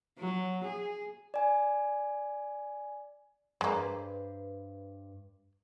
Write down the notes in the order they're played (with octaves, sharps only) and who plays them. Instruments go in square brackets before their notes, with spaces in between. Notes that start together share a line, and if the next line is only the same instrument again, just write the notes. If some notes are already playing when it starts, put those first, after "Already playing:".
[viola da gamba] F#3
G#4
[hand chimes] D5 G#5
[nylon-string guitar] G2 B4 C5 [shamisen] G#3 A#3